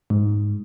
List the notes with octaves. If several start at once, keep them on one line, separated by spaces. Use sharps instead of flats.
G#2